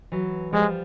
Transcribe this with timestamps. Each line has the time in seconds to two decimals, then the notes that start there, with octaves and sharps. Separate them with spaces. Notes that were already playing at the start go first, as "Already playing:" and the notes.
0.12 E3 F#3
0.52 F3 G3 G#3